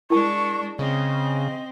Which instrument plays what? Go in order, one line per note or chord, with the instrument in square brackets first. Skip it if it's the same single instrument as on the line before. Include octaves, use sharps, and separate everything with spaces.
[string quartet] G#3 D4 [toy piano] E4 A#4 A5 [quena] C#6
[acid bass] C#3 [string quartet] C4 [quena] D#5